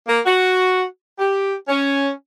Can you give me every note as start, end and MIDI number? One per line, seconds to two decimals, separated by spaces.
0.08 0.19 58
0.26 0.85 66
1.19 1.54 67
1.68 2.11 61